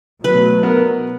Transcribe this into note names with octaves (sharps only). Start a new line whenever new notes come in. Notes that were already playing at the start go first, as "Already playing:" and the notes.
B2 F#3 A3 B4
B3 A#4